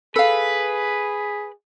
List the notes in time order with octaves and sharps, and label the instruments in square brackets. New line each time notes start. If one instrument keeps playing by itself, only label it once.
[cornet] G#4 [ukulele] A4 F5 [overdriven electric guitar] B4